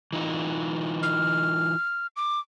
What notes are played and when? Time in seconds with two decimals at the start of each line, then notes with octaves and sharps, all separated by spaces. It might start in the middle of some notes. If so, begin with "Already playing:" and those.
0.13 E3 D#4 F4
1.03 F6
2.16 D6